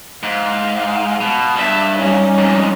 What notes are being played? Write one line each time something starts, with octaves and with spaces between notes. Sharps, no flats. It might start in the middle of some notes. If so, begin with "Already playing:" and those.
G#2 F5
B2
G2 E5 A5
G3 C#4 D#4
F2 G#2